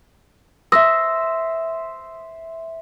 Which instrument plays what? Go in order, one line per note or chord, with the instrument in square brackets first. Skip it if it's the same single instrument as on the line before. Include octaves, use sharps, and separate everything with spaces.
[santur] C5 E5 [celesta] D#6 E6 A#6